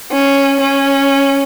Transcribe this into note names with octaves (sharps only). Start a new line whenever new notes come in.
C#4
C#4